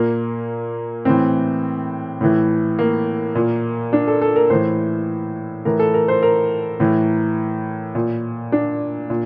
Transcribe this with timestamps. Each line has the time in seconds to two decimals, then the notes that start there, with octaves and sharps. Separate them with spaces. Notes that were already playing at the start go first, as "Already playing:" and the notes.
Already playing: A#2 A#3
1.05 A2 E3 C4
2.21 A2 E3
2.79 A#3
3.35 A#2
3.93 D4
4.08 A4
4.21 A4
4.36 A#4
4.50 A2 E3 C5
5.65 A2 E3 A#4
5.79 A4
5.94 A#4
6.08 C5
6.23 A#4
6.80 A2 E3
7.95 A#2
8.52 D4
9.10 A#2